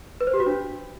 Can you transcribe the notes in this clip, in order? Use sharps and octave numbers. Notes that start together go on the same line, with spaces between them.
B4
C5
G4
F#4
D4